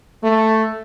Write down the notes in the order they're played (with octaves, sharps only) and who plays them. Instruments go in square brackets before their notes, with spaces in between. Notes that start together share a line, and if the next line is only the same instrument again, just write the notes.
[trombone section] A3